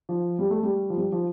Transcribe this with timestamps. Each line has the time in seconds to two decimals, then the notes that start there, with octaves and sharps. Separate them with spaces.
0.09 F3
0.39 G3
0.50 A3
0.63 G3
0.90 F3
0.97 G3
1.12 F3